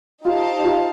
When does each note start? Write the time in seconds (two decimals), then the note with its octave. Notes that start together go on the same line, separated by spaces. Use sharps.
0.25 D#4 F4 G4 C5 F5 A5
0.64 F4